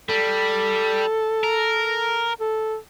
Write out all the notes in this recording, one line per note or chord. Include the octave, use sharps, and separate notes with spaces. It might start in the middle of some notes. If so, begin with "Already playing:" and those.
G3 A4
A#4
A4